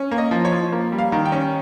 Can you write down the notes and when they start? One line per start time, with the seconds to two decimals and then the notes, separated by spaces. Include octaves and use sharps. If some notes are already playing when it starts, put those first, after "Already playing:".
Already playing: C#4
0.11 A#3
0.18 D#5
0.31 F3
0.45 C#5
0.52 F3
0.72 A#3
0.92 G3
0.99 F5
1.12 D#3
1.25 G5
1.32 C#4